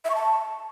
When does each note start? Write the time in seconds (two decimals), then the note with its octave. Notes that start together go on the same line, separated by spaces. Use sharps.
0.05 E5
0.10 C#6
0.15 A5